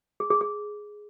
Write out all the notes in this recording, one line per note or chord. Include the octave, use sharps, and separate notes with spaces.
G#4
G#4
G#4